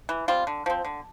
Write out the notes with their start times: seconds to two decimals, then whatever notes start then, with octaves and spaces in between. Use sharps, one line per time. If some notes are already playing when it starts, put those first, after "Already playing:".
0.09 E3
0.28 G3 C4 F4
0.47 D3
0.66 F3 C4
0.85 D3